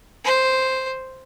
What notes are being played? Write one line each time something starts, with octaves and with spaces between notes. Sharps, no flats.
C5